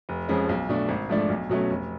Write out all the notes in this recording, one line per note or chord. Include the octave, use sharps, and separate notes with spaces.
F1
F2 F3 G#3 C#4
B1
B2 A3 D4
G#1
G#2 F3 A3 D4
B1
B2 F#3 A3 C#4
F1